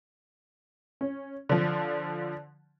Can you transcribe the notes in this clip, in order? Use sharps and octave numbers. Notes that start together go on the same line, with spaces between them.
C#4
D3 F3